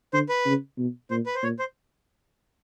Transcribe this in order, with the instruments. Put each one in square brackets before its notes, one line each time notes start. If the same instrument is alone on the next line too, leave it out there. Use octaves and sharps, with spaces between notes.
[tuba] D3 [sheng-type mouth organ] C5
[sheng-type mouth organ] B4
[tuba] C#3
B2
[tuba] A#2 [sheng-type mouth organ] C5
[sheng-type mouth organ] B4
C5
[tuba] A#2 [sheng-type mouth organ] C#5
[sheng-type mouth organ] C5